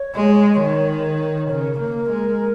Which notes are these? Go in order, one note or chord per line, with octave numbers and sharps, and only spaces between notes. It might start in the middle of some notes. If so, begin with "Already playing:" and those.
Already playing: C#5
G#3
D#3
C#3 A#4
A#3
G#3